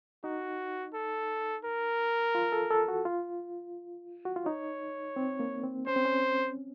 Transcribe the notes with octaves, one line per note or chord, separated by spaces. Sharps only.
D#4 F#4
A4
A#4
F4
A4
A4
F#4
F4
F#4
F4
D#4 C#5
C4
A#3
C4
C#4 C5
C4
C#4